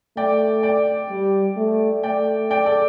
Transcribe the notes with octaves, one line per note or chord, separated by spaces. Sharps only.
A3 D5 G5
D5 G5
G3
A3
A3 D5 G5
D5 G5
A4 D5